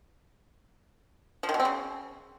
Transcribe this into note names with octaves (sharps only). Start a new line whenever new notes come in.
F3
D#3
B2
C4
C#3